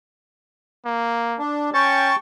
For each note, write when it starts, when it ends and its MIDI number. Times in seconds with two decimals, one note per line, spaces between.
0.86 1.39 58
1.39 1.70 62
1.74 2.13 61
1.74 2.16 79
1.74 2.15 81
1.74 2.16 85